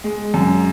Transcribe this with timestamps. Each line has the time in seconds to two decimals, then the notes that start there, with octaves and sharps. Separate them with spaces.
0.04 G#3
0.34 F#2